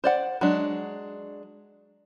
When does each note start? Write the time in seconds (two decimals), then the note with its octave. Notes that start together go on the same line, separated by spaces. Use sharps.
0.04 C5 D5 F#5
0.41 F#3 G#3 D4